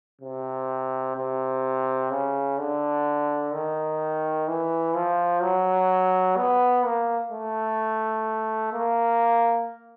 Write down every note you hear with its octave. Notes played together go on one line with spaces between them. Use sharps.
C3
C3
C#3
D3
D#3
E3
F3
F#3
B3
A#3
A3
A#3